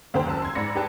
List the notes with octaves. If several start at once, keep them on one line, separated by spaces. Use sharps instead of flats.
D#2 D3 C5 G5
F#1 C#2 A5 E6
C6 G#6
G#2 D5 B5 A#6 C#7
D4 G4 G#4 B4 G5 A5